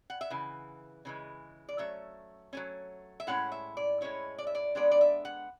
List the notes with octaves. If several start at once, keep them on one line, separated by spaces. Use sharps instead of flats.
F#5
E5
C#3 E3
C#3 E3 G#3
D5
F#3 A3 C#4 E5
F#3 A3 C#4
E5
A2 G#3 C#4 E4 F#5
E5
D5
A2 G#3 C#4 E4 C#5
D5
E5
D5
D3 G#3 B3 D4 D5
D5
E5
F#5